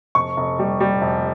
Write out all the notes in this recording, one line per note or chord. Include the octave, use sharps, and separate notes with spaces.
F1 C#6
F1
G3
G3
F1